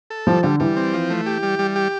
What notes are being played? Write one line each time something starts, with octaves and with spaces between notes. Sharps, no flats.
A4
F3 G3
D3 G3
E3 G3
C4
F3
A3
G4
G3
G3
G4